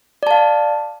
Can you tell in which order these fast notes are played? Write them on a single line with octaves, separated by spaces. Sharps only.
D5 A5 F5